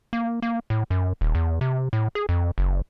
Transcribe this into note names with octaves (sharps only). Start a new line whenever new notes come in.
A#3
A#3
A2
F#2
D#1
E2
C3
A2
G#4
F2
F#1